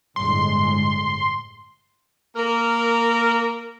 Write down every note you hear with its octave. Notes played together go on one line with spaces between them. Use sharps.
G1 A2 G#3 C6
A#3 A#4